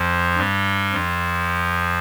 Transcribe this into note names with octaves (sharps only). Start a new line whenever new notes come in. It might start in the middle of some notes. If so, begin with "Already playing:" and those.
Already playing: F2 F3
G2 G3
F2 F3